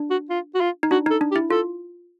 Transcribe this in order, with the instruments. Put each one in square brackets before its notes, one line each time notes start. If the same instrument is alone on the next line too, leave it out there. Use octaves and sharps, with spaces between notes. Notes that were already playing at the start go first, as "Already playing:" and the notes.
Already playing: [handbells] D4
[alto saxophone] F#4
F4
F#4
F4
[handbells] D#4
[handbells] D4 [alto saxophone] F#4
[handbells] D#4 [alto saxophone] A4
[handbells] D4
[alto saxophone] G4
[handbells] E4
[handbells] F4 [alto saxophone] A4